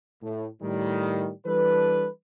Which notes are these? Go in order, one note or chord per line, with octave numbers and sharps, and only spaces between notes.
A2
A2 D#3 G3
E3 G3 D4 A4 B4